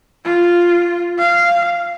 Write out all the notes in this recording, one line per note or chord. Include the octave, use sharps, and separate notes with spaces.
F4
F5